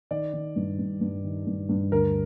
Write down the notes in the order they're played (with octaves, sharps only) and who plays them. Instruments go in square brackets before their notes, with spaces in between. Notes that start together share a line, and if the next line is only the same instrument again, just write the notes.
[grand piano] D#3 D5
D#3
G2
G2
G2
D#3
G2
G2
D2 A#4